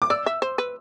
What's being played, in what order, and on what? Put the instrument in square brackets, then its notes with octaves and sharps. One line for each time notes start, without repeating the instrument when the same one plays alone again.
[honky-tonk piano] D6
[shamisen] D5 [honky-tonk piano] E6
[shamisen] E5
C5
B4